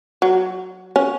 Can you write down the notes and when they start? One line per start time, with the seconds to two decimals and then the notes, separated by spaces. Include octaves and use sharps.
0.22 F#3
0.96 C#4